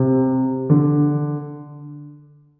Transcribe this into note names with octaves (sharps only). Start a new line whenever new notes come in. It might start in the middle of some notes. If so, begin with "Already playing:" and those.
Already playing: C3
D3